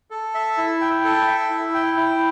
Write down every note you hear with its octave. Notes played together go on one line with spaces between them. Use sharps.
A4
E5
E4
G5
A4
E5
E4
G5
E4